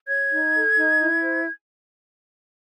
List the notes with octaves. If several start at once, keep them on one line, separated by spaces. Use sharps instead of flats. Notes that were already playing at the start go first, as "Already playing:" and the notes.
C#5 G#6
D#4
A4
D#4
E4
C5